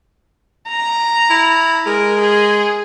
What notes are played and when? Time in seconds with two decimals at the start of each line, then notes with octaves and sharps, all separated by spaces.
0.68 A#5
1.30 E4
1.86 G#3 A#4
2.20 G#4